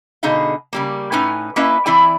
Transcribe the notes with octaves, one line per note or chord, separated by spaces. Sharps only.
B2 D3 D#4 G#4 D#5 F5
C#3 G3 A#3
A2 C#4 D#4 B4 G#5
A#3 C#4 E4 B4 D#5 E5
E3 C4 E4 D5 G#5